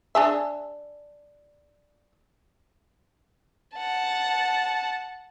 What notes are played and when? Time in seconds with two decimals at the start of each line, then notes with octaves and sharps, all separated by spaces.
0.15 D4 G#4 E5
3.76 F#5 A5